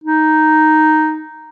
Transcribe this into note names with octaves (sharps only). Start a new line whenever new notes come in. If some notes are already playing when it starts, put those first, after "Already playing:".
D#4